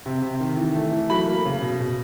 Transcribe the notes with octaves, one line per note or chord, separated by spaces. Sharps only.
C3
C3
D#3
E3
A3
E3
F#3 B5
A#3
C#3
B2
B2